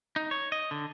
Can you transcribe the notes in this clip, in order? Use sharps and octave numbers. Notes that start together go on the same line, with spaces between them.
D#4
C#5
D#5
D3